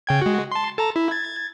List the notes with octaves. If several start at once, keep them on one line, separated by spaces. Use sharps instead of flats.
C#3 G5 G#6
G#3 F#4
A5 C6
A4 A5 A#5
E4
G#6 A6